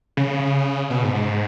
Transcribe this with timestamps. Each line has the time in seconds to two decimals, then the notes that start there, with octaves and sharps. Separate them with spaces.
0.17 C#3
0.90 B2
1.03 G#2
1.14 G#2